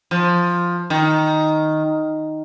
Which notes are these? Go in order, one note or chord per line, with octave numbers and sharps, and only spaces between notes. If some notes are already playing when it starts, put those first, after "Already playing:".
F3
D#3